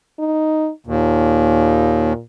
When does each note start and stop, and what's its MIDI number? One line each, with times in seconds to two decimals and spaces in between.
0.19 0.69 63
0.86 2.13 39
0.86 2.21 46